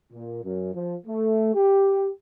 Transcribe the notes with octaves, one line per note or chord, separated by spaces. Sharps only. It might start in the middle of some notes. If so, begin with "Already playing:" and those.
A#2
F#2
F3
A3
G4